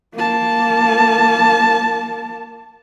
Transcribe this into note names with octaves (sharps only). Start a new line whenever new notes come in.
A#3 A5